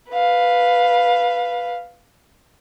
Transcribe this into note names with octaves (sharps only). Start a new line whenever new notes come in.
B4 F5